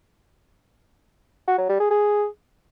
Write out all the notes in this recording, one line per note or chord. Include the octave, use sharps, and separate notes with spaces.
F#4
F#3
G3
G#4
G#4